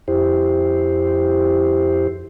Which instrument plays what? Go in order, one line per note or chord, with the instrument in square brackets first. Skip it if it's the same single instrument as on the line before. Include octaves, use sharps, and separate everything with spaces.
[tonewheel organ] F2 E4 G4 C5